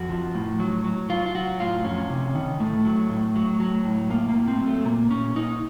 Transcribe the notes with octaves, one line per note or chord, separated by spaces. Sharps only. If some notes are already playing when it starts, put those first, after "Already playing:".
Already playing: F2 F#4
F3
A2
F#3
F#3
F#3 F4
F4
F#3 F#4
A2 F4
F2 C#4
C3
D#3
A2 A3
F#3
A2
F#3
F#3
A2
A2 A#3
A#3
A2
C4
F#3
A3
A#2 A#3
A#2 C#4
A#2 D#4